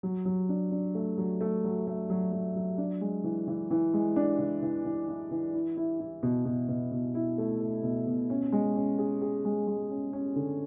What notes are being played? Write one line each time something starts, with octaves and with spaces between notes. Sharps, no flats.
F#3
F#3
D4
D4
A3
F#3
A3
F#3
A3
F#3
F#3
F#3
D4
G#3
E3
E3
E3
G#3
D4
E3
E3
E3
E3
E3
E4
E4
E4
B2
B2
B2
B2
E4
A3
A3
B2
B2
C#4
G#3
C#4
G#4
G#4
G#3
G#3
C#4
C#4
D3